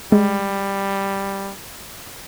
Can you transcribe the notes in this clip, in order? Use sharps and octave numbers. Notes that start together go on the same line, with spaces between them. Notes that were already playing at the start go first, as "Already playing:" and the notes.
G3 G#3